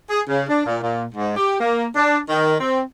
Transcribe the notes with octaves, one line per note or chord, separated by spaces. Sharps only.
G#4
C#3
D4
A#2
A#2
G#2
G4
A#3
D4
D#3
C4